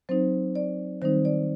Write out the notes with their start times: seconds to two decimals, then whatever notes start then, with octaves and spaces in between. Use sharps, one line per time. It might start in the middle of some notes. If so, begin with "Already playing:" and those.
0.09 F#3 C4 D#4 C5
0.55 D5
1.02 D#3 G3 C4 D#4 C5
1.25 D5